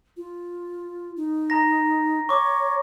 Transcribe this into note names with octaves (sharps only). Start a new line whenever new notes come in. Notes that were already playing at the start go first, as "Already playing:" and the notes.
F4
D#4
A#5 A#6
C#5 C#6 D6